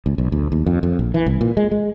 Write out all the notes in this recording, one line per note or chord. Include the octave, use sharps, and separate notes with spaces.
C#2
B1
D2
D#2
F2
F2
A#1
E3
C2
A#2
G#3
G#3